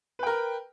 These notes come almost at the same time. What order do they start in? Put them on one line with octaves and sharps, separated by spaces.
B4 G5 A#4